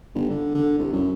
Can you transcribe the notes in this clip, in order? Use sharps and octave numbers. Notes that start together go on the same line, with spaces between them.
G1
D3
D3
C2
F#2